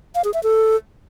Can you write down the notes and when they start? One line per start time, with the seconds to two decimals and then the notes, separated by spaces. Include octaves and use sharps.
0.15 F5
0.24 G#4
0.34 E5
0.43 A4